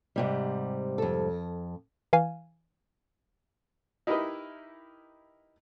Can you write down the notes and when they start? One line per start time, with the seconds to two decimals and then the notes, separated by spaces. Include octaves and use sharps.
0.16 G#2 C3 G3
0.98 F2 A4
2.13 E3 F5 G#5
4.07 D#4 E4 G4 A#4 B4 D#5